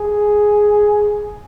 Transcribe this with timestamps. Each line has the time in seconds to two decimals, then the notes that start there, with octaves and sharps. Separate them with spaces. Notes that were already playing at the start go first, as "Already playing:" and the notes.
Already playing: G#4